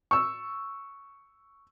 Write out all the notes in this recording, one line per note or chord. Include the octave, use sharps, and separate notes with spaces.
C#6 E6